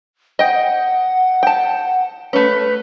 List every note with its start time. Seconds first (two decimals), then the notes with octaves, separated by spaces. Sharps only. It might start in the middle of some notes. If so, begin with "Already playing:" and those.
0.39 D#5 F#5 G5
1.43 G5 A5
2.33 A3 C#4 B4